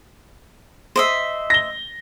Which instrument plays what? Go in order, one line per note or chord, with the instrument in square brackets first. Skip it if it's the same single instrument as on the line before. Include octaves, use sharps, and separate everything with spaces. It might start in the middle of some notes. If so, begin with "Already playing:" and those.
[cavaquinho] C5 D#5 E5
[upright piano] A#6 G7